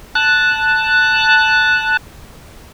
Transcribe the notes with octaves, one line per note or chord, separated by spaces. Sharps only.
A5 F#6